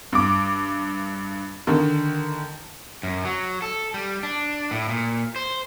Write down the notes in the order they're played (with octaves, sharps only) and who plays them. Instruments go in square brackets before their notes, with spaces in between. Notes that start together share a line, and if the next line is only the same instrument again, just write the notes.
[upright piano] G2 D6
D3 D#3
[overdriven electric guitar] F#2
F#3
A4
G3
D4
A2
A#2
C5